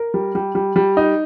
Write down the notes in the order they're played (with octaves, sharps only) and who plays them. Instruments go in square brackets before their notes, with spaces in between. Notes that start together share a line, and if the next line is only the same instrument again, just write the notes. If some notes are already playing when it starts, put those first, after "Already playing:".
Already playing: [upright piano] A#4
G3
G3
G3
G3
D#4